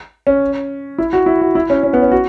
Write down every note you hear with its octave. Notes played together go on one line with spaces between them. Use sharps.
C#4
E4
F#4
E4
F#4
E4
C#4
C#4
B3
C#4
F#4